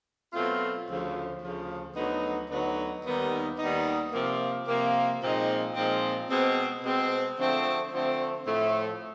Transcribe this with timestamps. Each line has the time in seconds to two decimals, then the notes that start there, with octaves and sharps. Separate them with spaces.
0.33 B2 F#3 A3 C4 F4
0.88 D2 C#3 F3
1.42 D2 C#3 F3
1.96 D2 D3 F#3 B3 D#4
2.50 D2 D3 F#3 B3 D#4
3.04 D#2 D#3 G3 B3 D#4
3.59 D#2 D#3 G3 B3 D#4
4.13 C3 F3 A#3
4.67 C3 F3 A#3
5.22 A#2 F3 G#3 C4 D#4
5.75 A#2 F3 G#3 C4 D#4
6.30 B2 G#3 C4
6.83 B2 G#3 C4
7.38 D3 F3 A3 C4
7.92 D3 F3 A3 C4
8.46 A2 F3 A3